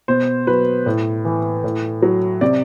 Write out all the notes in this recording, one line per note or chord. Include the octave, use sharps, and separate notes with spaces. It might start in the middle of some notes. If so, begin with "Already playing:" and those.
B2 C5
F#3 B4
A2
E3
A2
F#3
C3 D5